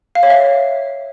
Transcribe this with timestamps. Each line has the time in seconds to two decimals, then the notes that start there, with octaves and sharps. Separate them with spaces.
0.15 F5
0.23 C#5
0.30 E5